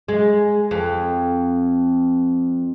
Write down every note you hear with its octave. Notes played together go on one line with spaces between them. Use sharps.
G#3
F2